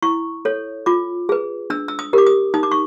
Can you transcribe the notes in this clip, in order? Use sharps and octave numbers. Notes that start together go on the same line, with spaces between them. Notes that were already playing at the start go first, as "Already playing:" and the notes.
E4 C#6
A4 C#5
F4 D6
G#4 B4
D4 E6
E6
D#6
G4 A#4 D6
D#6
D#4 D#6
D6
C#6